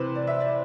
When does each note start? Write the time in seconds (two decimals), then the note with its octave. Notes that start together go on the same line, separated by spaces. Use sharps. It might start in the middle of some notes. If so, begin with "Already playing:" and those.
Already playing: C3 E3 B4 C5
0.15 D5
0.27 E5
0.41 D5